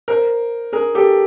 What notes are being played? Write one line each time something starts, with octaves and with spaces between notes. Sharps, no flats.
A#4 C5
G#4 A#4
G4 A4